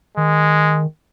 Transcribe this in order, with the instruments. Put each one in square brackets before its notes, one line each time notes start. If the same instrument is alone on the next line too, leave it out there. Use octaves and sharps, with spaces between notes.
[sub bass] D#3 [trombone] G#3